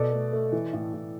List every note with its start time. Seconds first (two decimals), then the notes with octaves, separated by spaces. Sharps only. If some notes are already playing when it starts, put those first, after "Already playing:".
Already playing: B2 A4 D5
0.13 A3
0.32 A3
0.52 E3
0.73 A2
0.94 A2